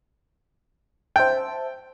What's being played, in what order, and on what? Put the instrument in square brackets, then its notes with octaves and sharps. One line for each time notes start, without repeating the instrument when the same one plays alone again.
[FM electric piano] C5 E5 A5 [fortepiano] G5